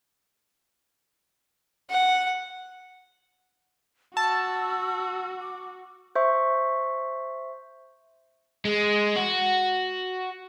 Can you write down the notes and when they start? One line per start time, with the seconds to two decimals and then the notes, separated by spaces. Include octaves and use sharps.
1.90 F#5
4.17 F#4 A5 E6
5.41 D6
6.15 C5 E5 C#6
8.65 G#3
9.16 F#4